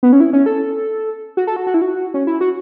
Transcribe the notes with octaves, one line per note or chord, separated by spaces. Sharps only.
B3
C#4
E4
C#4
A4
F#4
A4
F#4
F#4
E4
F#4
C#4
E4
F#4